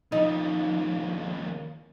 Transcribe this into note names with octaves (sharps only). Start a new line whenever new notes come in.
D#2 F3 D#4